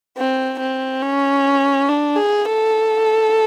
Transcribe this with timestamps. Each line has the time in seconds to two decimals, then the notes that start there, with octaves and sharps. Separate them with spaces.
0.17 C4
0.60 C4
1.03 C#4
1.89 D4
2.16 G#4
2.45 A4